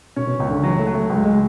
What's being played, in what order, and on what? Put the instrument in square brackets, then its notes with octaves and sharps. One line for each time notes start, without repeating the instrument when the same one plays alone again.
[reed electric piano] B2 [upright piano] C#4
[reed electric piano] B2
[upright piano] C#2 [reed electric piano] C#3
[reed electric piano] D3
[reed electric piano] E3 [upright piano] F#3
[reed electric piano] A3
[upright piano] F#3
[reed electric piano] A3
[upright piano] C#2 [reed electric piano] G#3
[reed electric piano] G#3